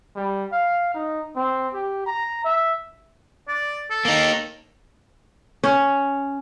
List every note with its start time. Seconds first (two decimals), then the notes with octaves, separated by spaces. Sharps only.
0.16 G3
0.52 F5
0.95 D#4
1.36 C4
1.74 G4
2.07 A#5
2.44 E5
3.48 D5
3.91 A4
4.05 A#3 D#4
5.64 C#4